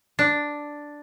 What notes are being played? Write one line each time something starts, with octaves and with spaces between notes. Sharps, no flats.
D4